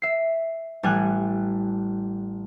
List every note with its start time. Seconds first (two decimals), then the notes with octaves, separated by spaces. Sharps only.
0.02 E5 C7
0.83 A1 G3 G#5 F#6